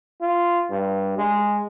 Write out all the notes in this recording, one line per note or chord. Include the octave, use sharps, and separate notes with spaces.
F4
G2
G#3